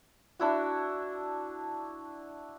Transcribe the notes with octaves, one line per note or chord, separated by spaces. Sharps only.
D4 E4 F#4